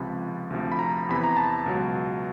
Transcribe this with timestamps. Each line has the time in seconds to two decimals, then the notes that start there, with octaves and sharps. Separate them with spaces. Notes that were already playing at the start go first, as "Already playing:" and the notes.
Already playing: C#2 C3 F3 B5
0.50 D2 C3 F3
0.72 B5
0.79 A#5
1.09 E2 C3 E3 B5
1.24 A#5
1.37 A5
1.66 C#2 B2 F#3